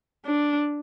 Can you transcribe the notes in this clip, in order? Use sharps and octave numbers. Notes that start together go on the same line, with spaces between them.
D4